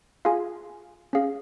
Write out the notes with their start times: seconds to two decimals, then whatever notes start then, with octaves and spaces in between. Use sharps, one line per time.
0.25 F4 G#4 F5 G#5
1.13 C#4 G#4 F5